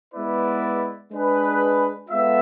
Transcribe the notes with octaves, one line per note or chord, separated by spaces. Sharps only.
G#3 B3 E4 B4 D5
G#3 D4 G#4 B4
G#3 B3 F4 A4 E5